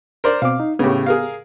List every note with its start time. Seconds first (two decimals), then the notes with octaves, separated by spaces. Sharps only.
0.24 A#4 C5 D5
0.42 B2 C4 F5 D6
0.60 D#4
0.79 A2 C#3 B3 G4
1.06 G#4 A#4 F5